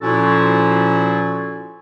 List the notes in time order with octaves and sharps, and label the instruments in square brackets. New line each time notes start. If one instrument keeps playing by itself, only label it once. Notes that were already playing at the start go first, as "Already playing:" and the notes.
[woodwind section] A#2 F3 C#4 E4 F#4 A4